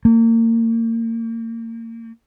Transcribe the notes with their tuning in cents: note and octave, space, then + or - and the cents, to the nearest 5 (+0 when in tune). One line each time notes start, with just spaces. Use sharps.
A#3 -35